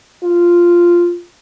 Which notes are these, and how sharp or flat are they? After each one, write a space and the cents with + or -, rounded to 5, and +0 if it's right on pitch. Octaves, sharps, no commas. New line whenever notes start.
F4 -5